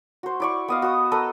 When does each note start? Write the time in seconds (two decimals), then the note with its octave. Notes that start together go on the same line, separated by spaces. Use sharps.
0.23 F#4 C5
0.40 E4 D5 C#6
0.68 B3 D#5 F5
0.82 F#4 D#6
1.11 A4 B4 D#5 A#5